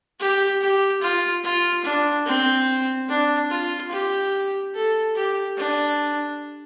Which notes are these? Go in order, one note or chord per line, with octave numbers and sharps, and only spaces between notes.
G4
G4
F4
F4
D4
C4
D4
F4
G4
A4
G4
D4